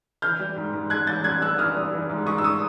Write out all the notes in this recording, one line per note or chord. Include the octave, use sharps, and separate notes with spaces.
E3 F6 G6
G3
G#2
G#2
G#2 F#6 G#6
A1 G6 A6
G3 F#6 G#6
G3 E6 F#6
E3 D#6 F6
G3
E3
G#2
G#2 C#6 D#6
E6
C#6 D#6